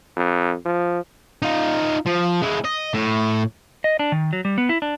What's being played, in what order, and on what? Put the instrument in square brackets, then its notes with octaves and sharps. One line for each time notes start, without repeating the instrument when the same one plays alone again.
[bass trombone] F2
F3
[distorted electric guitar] D#4 F4
F3
G#3 E4
D#5
A2
[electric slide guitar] D#5
D4
D#3
F#3
G3
B3
E4
D4